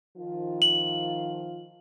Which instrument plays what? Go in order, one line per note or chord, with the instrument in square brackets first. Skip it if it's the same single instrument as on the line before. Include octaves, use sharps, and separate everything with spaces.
[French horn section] D#3 F3 F4
[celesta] F#7